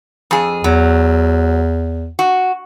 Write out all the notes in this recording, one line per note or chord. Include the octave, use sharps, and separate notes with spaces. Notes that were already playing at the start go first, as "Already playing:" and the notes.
F2 G#4
E2 F#3
F#4